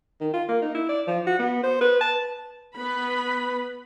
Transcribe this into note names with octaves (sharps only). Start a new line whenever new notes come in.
D#3
F4
A#3
D#4
E4
D5
F3
F#4
B3
C5
B4
A5
B3 B4 B5